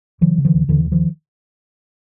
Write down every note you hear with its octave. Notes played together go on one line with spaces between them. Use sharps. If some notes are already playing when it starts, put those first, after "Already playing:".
C#3 E3 F#3
C#3
D#3 F3
D#2
D#2 D3 E3
C#3
D#3 F3